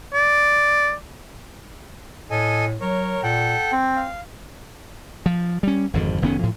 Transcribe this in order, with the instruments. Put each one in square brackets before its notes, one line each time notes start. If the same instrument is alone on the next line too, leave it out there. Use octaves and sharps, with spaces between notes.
[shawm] D5
[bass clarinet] A2 [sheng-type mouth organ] A4 D#5 G#5
[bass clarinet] F#3 [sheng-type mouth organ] A#4 C#5
[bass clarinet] A#2 [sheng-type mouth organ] A4 F#5 G5
[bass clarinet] C4
[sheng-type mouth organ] F5
[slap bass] F3
G3 C#4
G#1 F2 D3
F1 D#3 B3 C#4
A2 F3